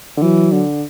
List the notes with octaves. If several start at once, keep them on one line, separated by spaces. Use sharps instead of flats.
D3
E3 F#3
D3